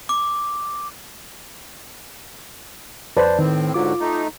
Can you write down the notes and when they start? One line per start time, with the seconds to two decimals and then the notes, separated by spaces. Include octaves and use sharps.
0.09 D6
3.17 F2 B4 C5 D5 A5
3.39 A2 D#3 C4
3.74 G#2 D3 F#3 F4 D6
4.00 A3 D#4